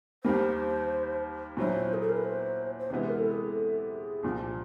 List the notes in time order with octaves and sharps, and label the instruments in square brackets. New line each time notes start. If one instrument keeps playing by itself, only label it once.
[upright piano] D#2 D#3 G3 A#3 [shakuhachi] C5
[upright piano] A#2 F#3 B3 E4 [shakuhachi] C5
[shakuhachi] G#4
A4
A#4
B4
C5
C5
[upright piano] C3 E3 G#3 B3 E4 [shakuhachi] B4
[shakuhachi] A#4
A4
G#4
A4
G#4
[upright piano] C2 A#2 F3